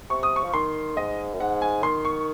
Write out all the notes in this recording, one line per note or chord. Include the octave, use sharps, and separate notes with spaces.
C3 C#6
D#6
C#6
F3
D#3 C6
G#2 D#5
F#2
G#2 F#5
G#5
D#3 C6
C#6